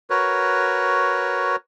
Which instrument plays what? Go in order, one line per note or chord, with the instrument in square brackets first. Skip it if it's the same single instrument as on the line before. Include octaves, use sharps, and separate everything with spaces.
[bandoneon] F#4 A#4 B4 C#5